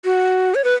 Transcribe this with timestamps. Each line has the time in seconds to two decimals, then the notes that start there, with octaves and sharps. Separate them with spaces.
0.05 F#4
0.55 C#5
0.64 B4